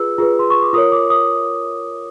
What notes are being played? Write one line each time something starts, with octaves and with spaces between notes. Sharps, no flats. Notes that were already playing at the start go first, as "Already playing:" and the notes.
Already playing: F4 G#4 B4 E6
F4 G#4 B4
C6
C#6
D6
F4 A#4 C#5 D#6
D6
D#6